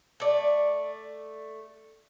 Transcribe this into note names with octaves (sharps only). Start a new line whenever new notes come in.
A3 D5